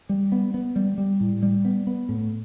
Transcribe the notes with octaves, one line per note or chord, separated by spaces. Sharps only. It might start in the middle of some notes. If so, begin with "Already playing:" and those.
G3
B3
B3
G3
G3
A2
G3
B3
B3
A2